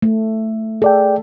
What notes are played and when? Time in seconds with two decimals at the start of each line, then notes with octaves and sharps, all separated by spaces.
0.02 A3
0.82 G#4 A4 D5 G5